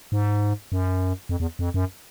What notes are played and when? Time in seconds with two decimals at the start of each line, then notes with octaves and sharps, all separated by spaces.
0.12 G#2
0.72 F#2
1.29 F2
1.40 E2
1.59 F2
1.74 F#2